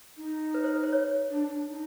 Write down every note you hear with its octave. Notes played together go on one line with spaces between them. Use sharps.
D#4
B4
C5
B4
C5
C#5
D4
D4
D#4